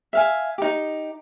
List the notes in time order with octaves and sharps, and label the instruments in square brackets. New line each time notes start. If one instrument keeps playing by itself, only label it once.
[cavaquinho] E5 F5 G#5
D#4 G4